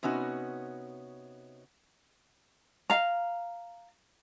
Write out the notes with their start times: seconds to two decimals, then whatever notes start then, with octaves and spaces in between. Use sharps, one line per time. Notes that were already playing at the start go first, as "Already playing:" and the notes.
0.03 C3 B3 C#4 D#4 F#4
2.90 F5 A#5